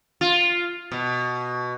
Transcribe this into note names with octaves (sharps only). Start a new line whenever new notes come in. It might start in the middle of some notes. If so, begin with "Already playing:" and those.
F4
B2